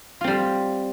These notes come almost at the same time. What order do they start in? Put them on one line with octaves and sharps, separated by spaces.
F4 C4 G3